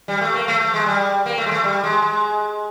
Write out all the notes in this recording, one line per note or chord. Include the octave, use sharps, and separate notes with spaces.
G3
A3
A#3
A3
A3
G#3
G3
A#3
A3
G#3
A3
G3
G#3
G#3